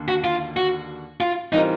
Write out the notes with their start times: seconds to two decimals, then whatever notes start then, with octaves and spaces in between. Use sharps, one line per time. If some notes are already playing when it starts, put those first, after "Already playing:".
Already playing: D#2 D3 A#3
0.08 F#4
0.24 F4
0.57 F#4
1.20 F4
1.53 E3 G3 C4 D#4 F4 A#4